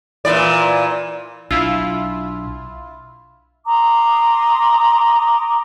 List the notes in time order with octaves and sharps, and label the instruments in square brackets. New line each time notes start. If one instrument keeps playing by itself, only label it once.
[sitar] A#2 E3 D5
[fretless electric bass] B1 [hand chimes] D4 E6 [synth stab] E4 F4
[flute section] A#5 C6 D6 D#6